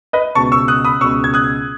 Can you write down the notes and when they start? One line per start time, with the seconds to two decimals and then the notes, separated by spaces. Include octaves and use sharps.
0.13 B4 D#5
0.35 C#2 B2 A5 C#6
0.52 C#6 E6
0.68 D#6 F#6
0.85 B5 D#6
1.01 C#2 B2 C#6 E6
1.24 G#6
1.34 D#6 F#6